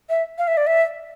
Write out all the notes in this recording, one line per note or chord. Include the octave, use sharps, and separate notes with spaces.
E5
F5
E5
D5
E5